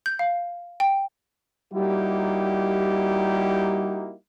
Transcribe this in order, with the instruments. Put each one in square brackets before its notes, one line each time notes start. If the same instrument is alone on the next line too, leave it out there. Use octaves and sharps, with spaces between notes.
[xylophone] G6
F5
G5
[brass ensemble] G3 A#3 D#4 E4 F#4 G4